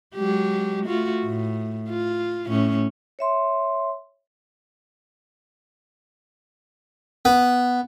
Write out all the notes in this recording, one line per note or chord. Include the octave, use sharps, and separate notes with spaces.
F#3 G#3 G4
A3 F4 F#4
A2
F4
A2 C#4
C#5 E5 C6
B3